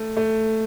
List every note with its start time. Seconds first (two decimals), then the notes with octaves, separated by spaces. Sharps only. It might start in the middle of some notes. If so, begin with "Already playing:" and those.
Already playing: A3
0.17 A3